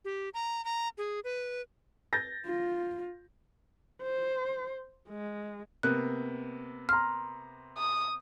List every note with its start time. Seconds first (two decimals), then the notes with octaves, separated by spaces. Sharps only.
0.05 G4
0.34 A#5
0.65 A#5
0.98 G#4
1.24 B4
2.13 G6 A6 A#6
2.46 F4
4.03 C5
5.09 G#3
5.83 C3 A#3 B3 F#6
6.89 A#5 C6 F6
7.78 D#6